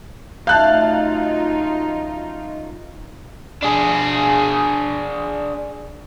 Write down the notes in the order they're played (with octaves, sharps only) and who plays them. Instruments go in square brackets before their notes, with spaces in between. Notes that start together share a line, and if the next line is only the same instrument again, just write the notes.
[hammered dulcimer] F#2 A3 [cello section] D#4 F4 [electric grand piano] F5 [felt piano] A5 F#6 G6
[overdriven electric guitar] D4 G#4